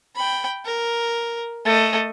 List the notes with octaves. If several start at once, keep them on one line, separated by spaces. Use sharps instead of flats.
G5 B5
A#4
A3 D#5